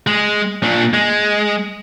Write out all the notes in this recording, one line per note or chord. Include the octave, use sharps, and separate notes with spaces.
G#3
A#2 D4
G#3